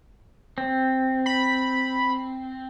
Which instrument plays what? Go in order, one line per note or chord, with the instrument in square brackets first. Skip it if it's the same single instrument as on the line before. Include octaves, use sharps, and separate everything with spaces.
[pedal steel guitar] C4
[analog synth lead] B5